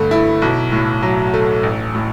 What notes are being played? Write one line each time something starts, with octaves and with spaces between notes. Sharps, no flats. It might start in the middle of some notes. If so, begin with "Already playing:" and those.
Already playing: G2 D3 A3
E4
B1
A2
F#3
A3
A1
A2